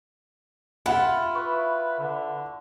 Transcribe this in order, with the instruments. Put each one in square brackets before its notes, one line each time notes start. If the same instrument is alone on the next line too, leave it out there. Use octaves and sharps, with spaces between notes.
[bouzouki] E4 F4 [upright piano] F#5
[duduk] B4 [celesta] C#6
[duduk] D3